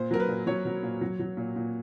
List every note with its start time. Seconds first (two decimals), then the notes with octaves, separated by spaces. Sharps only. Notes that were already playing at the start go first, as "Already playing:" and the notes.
Already playing: A#2 C5
0.11 F#3 A#4
0.20 B4
0.28 A#2
0.47 F#3 C#5
0.65 F#3
0.83 A#2
1.01 F#3
1.19 F#3
1.37 A#2
1.56 A#2